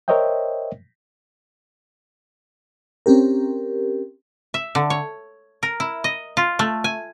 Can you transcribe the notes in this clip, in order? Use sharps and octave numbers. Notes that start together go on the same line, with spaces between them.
A#4 C5 C#5 D#5 E5 G5
C4 C#4 G4 A#4
E5
D3
C#5
A#4
E4
D#5
F4
A3
G#5